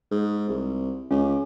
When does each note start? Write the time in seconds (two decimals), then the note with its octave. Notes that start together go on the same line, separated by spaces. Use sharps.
0.12 G#2
0.49 C2
1.11 C#2 C#4